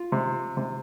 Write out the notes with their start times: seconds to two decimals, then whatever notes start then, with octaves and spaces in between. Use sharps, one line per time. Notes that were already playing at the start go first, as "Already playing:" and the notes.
Already playing: F4
0.12 C3
0.57 C3